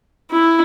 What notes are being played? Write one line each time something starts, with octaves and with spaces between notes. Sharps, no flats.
E4